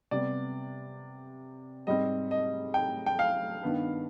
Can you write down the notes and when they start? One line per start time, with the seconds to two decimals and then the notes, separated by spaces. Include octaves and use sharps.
0.11 C3 G3 B3 D5
1.87 G#2 G3 C4 D#5
2.31 D#5
2.74 G5
3.06 G5
3.19 F5
3.63 G2 D#3 B3